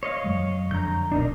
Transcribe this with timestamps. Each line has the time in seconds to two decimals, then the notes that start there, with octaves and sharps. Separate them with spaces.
0.03 C#5 D#5 F5
0.24 F#2 F#3 G#3
0.71 F2 D3 A#5 G6
1.12 D#1 B1 D4 D#4 A#4